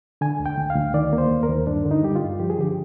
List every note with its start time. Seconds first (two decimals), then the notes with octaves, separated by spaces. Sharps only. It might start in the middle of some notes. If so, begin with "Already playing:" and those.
0.21 D3 G#5
0.40 D2
0.46 G5
0.58 D2
0.70 F5
0.75 D2
0.94 D#3 D5
1.13 A#3
1.18 C5
1.31 D#2
1.43 A#4
1.49 D#2
1.67 G2 D4
1.85 D3
1.91 D#4
2.03 G3 G4
2.16 F4
2.22 G2
2.40 F3 G4
2.50 G#4
2.58 D3 G4